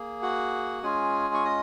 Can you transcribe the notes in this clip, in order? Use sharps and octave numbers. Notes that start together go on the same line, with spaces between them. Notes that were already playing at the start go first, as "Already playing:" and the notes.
Already playing: A#3 G#4
F#4 F#5
G#3 C#4 F4 G#4 G#5
C#6
D#5 D#6